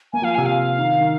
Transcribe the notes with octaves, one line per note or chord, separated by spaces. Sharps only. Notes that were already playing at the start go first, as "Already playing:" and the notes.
A#3 G#5
F3 F5
C3 G#5
F5
D#3
D#3